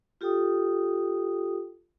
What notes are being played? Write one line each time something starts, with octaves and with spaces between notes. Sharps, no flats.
F4 G4 A4 G5 D#6